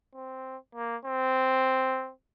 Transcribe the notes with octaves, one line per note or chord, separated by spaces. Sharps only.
C4
A#3
C4